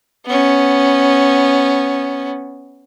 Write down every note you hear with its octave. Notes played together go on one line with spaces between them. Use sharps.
B3 C#4